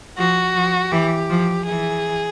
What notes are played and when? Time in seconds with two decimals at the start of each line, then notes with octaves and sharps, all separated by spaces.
0.18 F3 F#4
0.55 F3
0.92 E3 G4
1.29 F3
1.66 E3 G#4